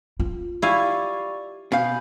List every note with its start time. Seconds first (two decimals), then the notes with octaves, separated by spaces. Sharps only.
0.20 F4
0.62 E4 G4 D5 F5 G#5 C#6
1.72 B2 F5 G#5 B5 G6